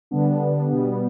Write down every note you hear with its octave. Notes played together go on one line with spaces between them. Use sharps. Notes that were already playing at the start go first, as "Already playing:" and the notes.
D3 G3 B3 D4
B2 G3 B3